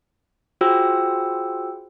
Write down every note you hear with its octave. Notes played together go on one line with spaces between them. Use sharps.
F4 F#4 G#4 C5 G5 E6